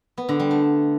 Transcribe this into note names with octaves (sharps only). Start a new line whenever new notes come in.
B3
D3
G3
A3